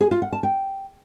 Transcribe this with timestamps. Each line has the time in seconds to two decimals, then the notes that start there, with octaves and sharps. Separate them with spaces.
0.01 G#4
0.11 F4
0.22 F#5
0.33 A5
0.43 G5